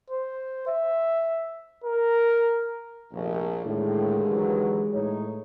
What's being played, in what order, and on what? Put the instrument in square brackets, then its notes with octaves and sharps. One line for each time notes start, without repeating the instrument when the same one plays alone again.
[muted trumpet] C5
E5
A#4
[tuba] F1 [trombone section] A#1
[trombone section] D#2 D3 [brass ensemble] A2 [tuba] G#3
[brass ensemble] E3 F#3 B4
A2 D#4 C#5